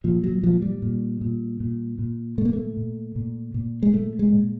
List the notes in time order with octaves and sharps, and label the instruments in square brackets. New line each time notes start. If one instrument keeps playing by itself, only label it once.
[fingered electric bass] A#2 F3
F#3
A#2 F3
G3
A#2
A#2
A#2
A#2
A#2 A3
A#3
A3
A#2
A#2
A#2
G#3
A#2 A3
G#3
A#2